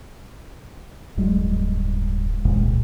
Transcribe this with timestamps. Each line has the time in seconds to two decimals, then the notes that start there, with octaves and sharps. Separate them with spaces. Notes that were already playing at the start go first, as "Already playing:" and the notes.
1.17 D1 G2 F#3 G#3
2.45 D#1 C#2 A#2 G#3